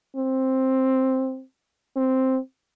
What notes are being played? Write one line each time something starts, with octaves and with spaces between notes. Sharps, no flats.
C4
C4